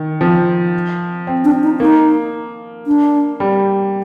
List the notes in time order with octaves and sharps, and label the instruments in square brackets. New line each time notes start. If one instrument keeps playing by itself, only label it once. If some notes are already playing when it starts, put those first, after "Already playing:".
Already playing: [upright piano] D#3
F3
C4
[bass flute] D4
D#4
[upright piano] A#3 [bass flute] D#4
[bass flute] D4
[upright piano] G3